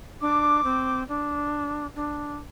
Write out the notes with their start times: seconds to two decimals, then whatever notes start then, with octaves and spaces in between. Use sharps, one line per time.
0.21 D4 D6
0.64 C4
1.08 D4
1.95 D4